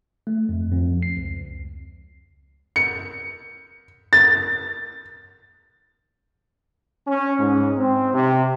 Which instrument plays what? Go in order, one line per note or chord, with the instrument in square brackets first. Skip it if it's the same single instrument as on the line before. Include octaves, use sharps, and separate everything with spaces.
[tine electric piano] A3
F2
F2
C7
C#2
[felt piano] C#7
A6
[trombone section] C#4
G#2
C4
C3